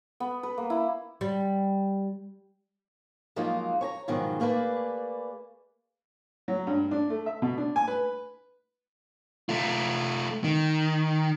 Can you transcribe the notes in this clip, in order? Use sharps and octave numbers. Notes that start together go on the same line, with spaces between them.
B3
B4
A#3
E4
G3
F3 F#3 G#3 A#3 D#4 F4
C#5 G#5 A#5
G#2 B2 D#3 F3 F#3 G#3
A3 A#3 G#4 B4 D5
F#3
G2
D4
A3
E5
B2
D4
G#5
B4
A3 F4
D#3